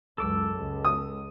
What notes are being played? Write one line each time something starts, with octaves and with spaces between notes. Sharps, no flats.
C#2 F#2 A4 D6 E6
C#2
D#6